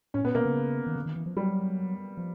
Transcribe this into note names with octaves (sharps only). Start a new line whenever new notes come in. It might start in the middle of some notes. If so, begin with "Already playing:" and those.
A2 C#4
A#2 B3
B2 A#3
C#3
D#3
D3
D#3
E3
F3
F#3 G3
F3